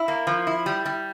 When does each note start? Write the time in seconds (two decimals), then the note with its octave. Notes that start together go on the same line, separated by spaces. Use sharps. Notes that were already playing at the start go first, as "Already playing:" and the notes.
Already playing: E4
0.08 A#3
0.27 F3
0.47 E4
0.66 G3
0.86 G3